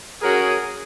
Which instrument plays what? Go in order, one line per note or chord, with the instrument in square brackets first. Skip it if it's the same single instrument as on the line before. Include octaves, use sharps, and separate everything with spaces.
[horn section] F#3 C#4 F#4 A#4 [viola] G#4